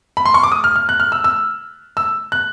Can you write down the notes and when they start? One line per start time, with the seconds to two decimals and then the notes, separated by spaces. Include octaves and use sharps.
0.17 B5
0.25 C6
0.34 C#6
0.43 D6
0.52 D#6
0.64 F6
0.76 F6
0.89 F#6
1.00 F6
1.12 E6
1.24 E6
1.97 E6
2.32 F#6